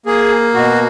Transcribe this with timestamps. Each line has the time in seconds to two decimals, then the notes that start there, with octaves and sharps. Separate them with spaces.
0.06 A#3 G#4
0.54 B2 F#4